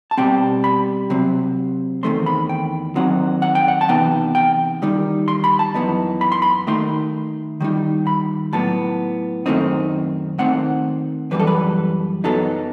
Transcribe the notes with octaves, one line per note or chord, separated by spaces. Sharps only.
A5
B2 G3 C4 G5
B5
C3 F#3 C4
E2 D#3 A3 C4 C6
B5
G5
D#3 F#3 C4 D#4 F#5
F#5
G5
F#5
A5
C3 E3 B3 D#4 G5
G5
D#3 G3 D#4
C6
B5
A5
F#2 E3 B3 D#4
B5
C6
B5
D#3 A3 D#4 C6
D#3 G3 D#4
B5
A2 F#3 B3 A5
F#2 D#3 A3 C4 D#4
D#3 A3 C4 D#4 F#5
F#2 E3 G3 B4
A4
B4
F#2 F#3 B3 D#4 A4